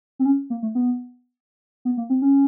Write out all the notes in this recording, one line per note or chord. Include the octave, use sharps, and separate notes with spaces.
C4
C#4
A#3
A3
B3
B3
A#3
C4
C#4